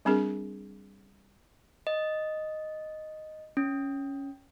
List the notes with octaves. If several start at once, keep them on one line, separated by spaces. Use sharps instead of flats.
G3 C4 D4 G#4 A#4
D#5
C#4